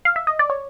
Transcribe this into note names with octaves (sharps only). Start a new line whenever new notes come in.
F5
E5
D#5
D5
C#5